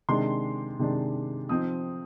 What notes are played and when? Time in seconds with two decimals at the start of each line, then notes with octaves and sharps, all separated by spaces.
0.09 C3 D#3 G#3 D4 C6
0.79 C3 D#3 G#3 D4
1.49 F3 C4 D#4 D#6